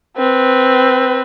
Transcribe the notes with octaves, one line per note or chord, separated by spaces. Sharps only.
C4 B4